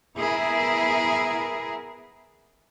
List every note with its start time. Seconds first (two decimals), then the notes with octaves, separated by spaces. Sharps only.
0.16 B3 E4 G#4 A#4